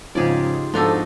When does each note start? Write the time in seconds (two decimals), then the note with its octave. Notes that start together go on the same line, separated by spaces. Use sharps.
0.15 G#2 C#3 F3 D#4 F4 G4 G#4 D5
0.74 G#2 F3 B3 D4 D#4 F#4 A4